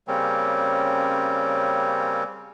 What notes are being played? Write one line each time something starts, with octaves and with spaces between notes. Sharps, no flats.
C#3 G3 A#3 C4 C#4